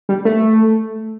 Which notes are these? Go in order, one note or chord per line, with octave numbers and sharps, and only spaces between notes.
G3
A3